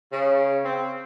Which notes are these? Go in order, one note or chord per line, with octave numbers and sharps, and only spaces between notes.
C#3
C4